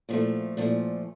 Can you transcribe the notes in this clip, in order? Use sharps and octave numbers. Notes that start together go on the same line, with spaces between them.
A#2 F3 A3
A#2 F3 A3